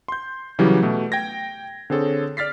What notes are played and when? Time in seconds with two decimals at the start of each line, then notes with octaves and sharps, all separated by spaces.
0.08 C6 G6
0.59 C#3 E3 F#3 G3 C#4 G4
0.83 B2 A3
1.12 G5 G#6 A#6
1.90 D3 C4 G#4 A4 C#5
2.37 D5 F6 A6 B6 C7